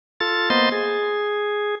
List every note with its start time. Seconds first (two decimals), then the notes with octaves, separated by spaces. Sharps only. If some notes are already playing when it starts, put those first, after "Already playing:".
0.20 F4 A4 A6
0.50 A#3 B3 C5 D#5 C6 A6
0.72 G#4